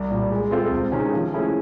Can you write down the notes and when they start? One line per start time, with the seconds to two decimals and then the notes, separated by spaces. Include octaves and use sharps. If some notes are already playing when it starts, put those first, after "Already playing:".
Already playing: C2
0.10 A#2 G3
0.31 G#3
0.51 C4 F4 A4 C5
0.72 C#2
0.92 C3 D#3 G#3 C#4
1.13 F3
1.33 A3 C#4 E4 G#4